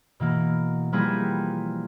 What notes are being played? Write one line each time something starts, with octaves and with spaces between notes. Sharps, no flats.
B2 E3 A#3
F3 G3 A#3 E4 G#4 B4